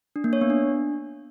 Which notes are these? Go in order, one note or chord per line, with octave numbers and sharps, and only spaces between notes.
D4
A#3
C#5
B3
D4